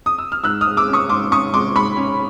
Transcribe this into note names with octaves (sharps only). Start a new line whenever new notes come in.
D#6
E6
F6
G#2 E6 F#6
G#3 D#6 F6
D6 E6
C#4
C#6 D#6
G#2 C6 D6
C#4 C#6 D#6
G#3 C6 D6
G#2 B5 C#6
C#4